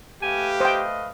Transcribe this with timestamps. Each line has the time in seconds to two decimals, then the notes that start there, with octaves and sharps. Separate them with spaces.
0.22 A3 G4 B4 F5 G#5
0.61 C5 D#5 G5